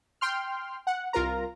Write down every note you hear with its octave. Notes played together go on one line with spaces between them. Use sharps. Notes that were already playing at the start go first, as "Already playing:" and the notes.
G5 C6 F6
F#5
C2 F4 A#4 A#5